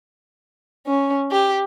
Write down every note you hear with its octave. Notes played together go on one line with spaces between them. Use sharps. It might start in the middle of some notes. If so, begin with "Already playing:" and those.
C#4
G4